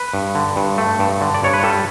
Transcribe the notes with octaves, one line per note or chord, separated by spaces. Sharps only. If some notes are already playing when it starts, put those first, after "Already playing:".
Already playing: B4
G2
D3
G2
A3
G2
D3
D5
G2 C#5
B4
G3 A4